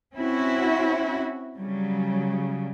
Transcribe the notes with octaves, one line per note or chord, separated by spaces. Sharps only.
C4 C#4 E4 F#4
C#3 F#3 G3